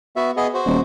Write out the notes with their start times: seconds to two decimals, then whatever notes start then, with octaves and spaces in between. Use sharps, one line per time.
0.16 B3 F#4 E5
0.37 B3 G#4 D#5
0.54 F#4 C5
0.66 D#1